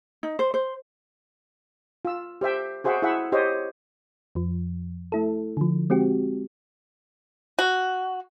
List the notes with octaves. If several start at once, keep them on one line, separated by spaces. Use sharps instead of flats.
D#4
C5
C5
F4 E6
G4 C5 E5 G5
F#4 G#4 C5 E5 F#5 G5
E4 G#4 E5 F#5 E6
G4 C5 C#5 D#5
F2 F3
A3 E4 A4
D3 F3
G#3 C4 F#4 G4
F#4